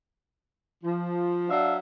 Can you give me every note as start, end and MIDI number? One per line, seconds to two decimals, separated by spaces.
0.83 1.46 53
1.49 1.75 54
1.49 1.75 62
1.49 1.75 76
1.49 1.75 77